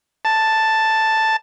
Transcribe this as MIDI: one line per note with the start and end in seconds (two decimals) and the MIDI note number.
0.25 1.36 81